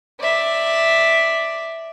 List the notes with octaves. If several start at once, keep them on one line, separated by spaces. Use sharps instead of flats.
D5 E5